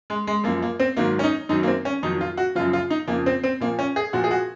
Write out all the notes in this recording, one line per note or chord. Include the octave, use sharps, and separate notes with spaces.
G#3
G#3
F#2 F3 A#3
A#3
C4
G#2 D#3 F#3 A#3
C#4
D#4
F#2 D#3 F#3 D#4
A#3
C4
C#4
F2 D#3 F#3 D#4
F4
F#4
F#2 C#3 F3 F4
F4
D#4
F2 C#3 F3 A#3
C4
C4
A#2 F3 A#3
C#4
G#4
A#2 F3 F#4
G#4
F#4